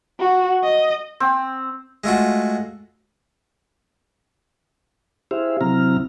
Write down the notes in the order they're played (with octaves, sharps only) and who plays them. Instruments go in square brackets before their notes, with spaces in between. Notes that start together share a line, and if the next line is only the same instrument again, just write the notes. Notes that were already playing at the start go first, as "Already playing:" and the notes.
[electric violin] F#4
D#5
[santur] C4
[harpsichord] G#3 A3 F4 F#4
[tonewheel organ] E4 G4 G#4 C5 E5 F5
C3 F#3 C4 E4 A#5 F6